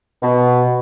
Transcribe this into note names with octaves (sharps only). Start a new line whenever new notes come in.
B2